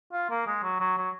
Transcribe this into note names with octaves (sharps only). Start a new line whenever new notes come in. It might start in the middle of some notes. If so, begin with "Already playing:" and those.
F4
A#3
G#3
F#3
F#3
F#3